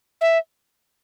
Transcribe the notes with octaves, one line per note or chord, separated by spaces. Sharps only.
E5